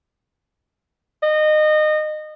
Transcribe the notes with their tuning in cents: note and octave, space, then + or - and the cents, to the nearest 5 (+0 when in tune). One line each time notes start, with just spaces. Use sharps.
D#5 -25